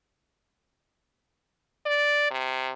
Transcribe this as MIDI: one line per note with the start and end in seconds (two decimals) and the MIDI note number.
1.86 2.29 74
2.31 2.72 48